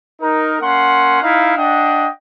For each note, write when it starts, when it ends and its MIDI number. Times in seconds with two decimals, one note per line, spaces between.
0.21 0.56 63
0.21 0.56 70
0.61 1.21 58
0.61 1.21 61
0.61 1.21 78
0.61 1.21 84
1.21 1.53 63
1.21 1.53 64
1.21 1.53 77
1.57 2.09 62
1.57 2.09 75
1.57 2.09 78
1.57 2.09 79